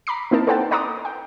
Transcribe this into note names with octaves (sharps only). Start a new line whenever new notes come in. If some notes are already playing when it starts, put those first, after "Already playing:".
A#5 B5 D6 C7
A#3 C4 D#4 E4 A#4 A5
A4 B4 C5 F#5 G5 A5
D5 F#5 A#5 C6 D6 D#6
G5